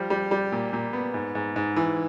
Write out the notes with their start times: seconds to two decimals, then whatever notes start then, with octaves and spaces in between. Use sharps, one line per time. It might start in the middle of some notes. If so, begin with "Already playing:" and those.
Already playing: F3 G3
0.10 G3
0.31 G3
0.52 A#2
0.73 A#2
0.93 B3
1.14 G#2
1.35 G#2
1.56 G#2
1.76 E3